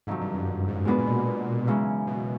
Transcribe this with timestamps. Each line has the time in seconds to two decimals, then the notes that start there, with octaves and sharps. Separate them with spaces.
0.07 F2 G#2 C3 D#3 F#3
0.21 G2
0.34 F#2
0.47 G2
0.68 G#2
0.85 A#2 G#3 B3 D4 F#4 B4
0.98 A#2
1.07 B2
1.67 F#2 C#3 E3 G#3 C#4
2.07 B2